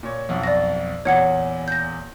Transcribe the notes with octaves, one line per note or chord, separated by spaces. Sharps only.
A#2 C#5
B1 F2
D5 A#6
E2 A#2 C#5 F#5 G#6
G6 A#6